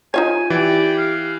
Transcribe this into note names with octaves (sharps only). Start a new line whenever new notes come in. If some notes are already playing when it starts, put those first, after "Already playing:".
D#4 F4 C#5 G#5
E3 G4 D5
F5